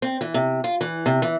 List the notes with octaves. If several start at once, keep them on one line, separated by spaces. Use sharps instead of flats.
C4
E3
C3
F4
E3
C3
E3